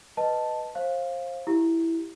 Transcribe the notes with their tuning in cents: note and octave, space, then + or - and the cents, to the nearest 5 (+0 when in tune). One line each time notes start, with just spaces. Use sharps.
B4 +0 D#5 -5 A5 +0
C5 +30 F5 +0
E4 +0 G4 +0